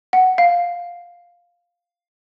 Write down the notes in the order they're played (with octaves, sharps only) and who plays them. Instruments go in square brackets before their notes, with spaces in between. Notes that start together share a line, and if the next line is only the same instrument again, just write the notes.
[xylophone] F#5
F5